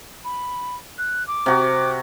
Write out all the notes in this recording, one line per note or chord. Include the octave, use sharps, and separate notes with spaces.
B5
F#6
D6
C3 F#4